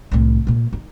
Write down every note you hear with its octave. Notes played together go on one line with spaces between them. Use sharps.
C2 A2
A#2 A#3
D#4